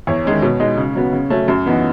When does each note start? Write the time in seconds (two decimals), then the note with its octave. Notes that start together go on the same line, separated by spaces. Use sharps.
0.07 E2 C#5
0.25 D#3 G#3 C#4
0.42 B2 C#5
0.60 G#3 D#4
0.77 C#3
0.95 F#3 B3
1.13 C#3
1.30 F#3 A3 C#4
1.48 F#2
1.66 E3 B3 D#4